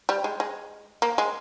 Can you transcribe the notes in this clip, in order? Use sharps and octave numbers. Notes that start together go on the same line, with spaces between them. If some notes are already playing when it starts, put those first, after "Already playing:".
G3
G#3
G#3
A#3
G#3